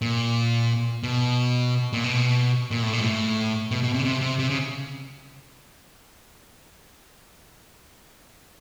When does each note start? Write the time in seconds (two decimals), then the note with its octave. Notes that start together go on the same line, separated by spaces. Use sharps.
0.02 A#2
1.03 B2
1.93 A#2
2.04 B2
2.71 A#2
2.82 A2
2.93 A#2
3.00 G#2
3.04 A2
3.71 B2
3.83 B2
3.94 C3
3.99 C#3
4.05 C3
4.21 C3
4.39 C3
4.50 C#3